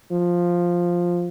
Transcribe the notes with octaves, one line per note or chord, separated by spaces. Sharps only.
F3